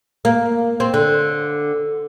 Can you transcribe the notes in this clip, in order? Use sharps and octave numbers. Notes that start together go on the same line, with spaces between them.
A#3
C4
D3